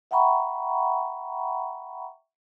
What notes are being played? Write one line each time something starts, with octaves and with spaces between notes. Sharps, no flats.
E5 F#5 G5 A#5 B5 C#6